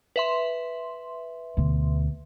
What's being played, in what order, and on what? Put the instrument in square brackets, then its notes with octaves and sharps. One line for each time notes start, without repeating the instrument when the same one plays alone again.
[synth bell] B4 E5 C6
[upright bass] D2 B2